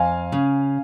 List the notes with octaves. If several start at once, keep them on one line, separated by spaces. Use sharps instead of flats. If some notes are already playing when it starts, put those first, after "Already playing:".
Already playing: F2 F5 G#5
C#3